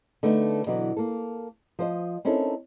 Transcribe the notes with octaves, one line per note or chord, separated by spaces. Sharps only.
D3 A3 B3 D#4
B2 D3 E3 F#3
A#3 A4
F3 C5 D#5
C4 C#4 D#4 E4 A4 A#4